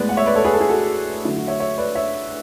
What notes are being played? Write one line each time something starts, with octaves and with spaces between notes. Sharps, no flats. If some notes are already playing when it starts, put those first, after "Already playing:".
Already playing: A2 G#3 B3 B4 D5
F#5
C#5 E5
B4 D5
A4 C#5
G#4 B4
A4
G#4
F#4 A4
D3 F#3 A3 E4
F#4
C#5 E5
C#5 E5
B4 D5
C#5 E5